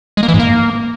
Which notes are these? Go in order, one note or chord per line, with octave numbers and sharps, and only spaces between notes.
G#3
A#3
E3
G#2
A#3